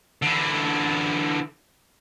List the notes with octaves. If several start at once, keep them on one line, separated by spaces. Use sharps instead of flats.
D3 E3